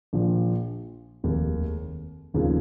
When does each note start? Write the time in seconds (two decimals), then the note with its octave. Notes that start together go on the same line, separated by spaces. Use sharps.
0.13 A#1 A#2 F3
1.24 F1 D#2 D#3 G#3
2.34 F1 D#2 C#3 F3